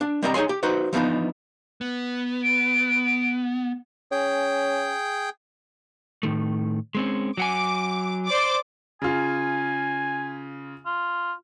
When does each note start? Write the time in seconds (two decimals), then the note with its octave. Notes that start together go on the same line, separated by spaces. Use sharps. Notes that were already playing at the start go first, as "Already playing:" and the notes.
0.01 D4
0.23 G3 C4 D5 D#5 G5 A#5
0.34 D#4 G#4 C#5 G#5 C6
0.49 G4
0.63 D#4 F#4 B4 C5
0.93 E3 F3 B3 D4 D#4
1.81 B3
2.43 D7
4.11 C#4 G#4 G5
6.23 A2 D#3 A3
6.95 G#3 C4 C#4
7.37 F#3 F#5 G#5 D6
8.26 C5 D5 D6
9.02 C#3 F4 G#5
10.86 F4